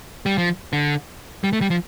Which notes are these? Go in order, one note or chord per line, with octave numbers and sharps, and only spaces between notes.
G3
F3
D3
G3
A3
G3
F3